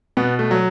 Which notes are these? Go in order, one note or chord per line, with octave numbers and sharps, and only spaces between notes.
B2 B3
A3
F#3